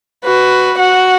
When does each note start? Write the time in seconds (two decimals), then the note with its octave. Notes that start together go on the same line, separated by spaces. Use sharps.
0.24 F#4 B4
0.79 F#4 F#5